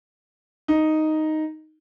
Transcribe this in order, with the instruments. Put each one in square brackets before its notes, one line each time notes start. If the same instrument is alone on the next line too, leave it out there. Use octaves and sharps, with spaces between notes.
[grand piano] D#4